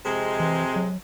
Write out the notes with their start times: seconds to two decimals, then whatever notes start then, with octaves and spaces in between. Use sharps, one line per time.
0.05 F2 C3 G#3
0.40 E3
0.76 F#3